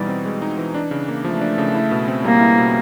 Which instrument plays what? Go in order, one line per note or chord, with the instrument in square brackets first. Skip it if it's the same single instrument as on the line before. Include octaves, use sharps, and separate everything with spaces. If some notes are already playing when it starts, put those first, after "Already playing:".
Already playing: [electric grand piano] B2 E3 D#4 [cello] G3
[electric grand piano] C4
G#3
D#4
E3
D4
C#3
A#3
[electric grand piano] F3 [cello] A3
[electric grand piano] D4
C#3
E4
B2
C4
[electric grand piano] G3 [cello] A#3
[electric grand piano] E4
B2